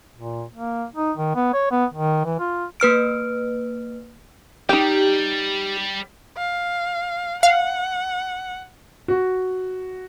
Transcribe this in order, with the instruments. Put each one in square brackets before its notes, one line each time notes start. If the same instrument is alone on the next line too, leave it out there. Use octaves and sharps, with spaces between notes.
[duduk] A#2
A#3
D#4
D#3
B3
C#5
B3
D#3
E3
F4
[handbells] A#3 B4 F6 D7
[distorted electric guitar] G3 [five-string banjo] D#4 G5 [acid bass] G4
[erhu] F5
[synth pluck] F5 [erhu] F#5
[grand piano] F#4